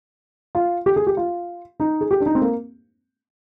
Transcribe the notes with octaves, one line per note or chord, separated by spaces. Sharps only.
F4
G4
G#4
G4
F4
D#4
G#4
G4
D4
D#4
C4
A#3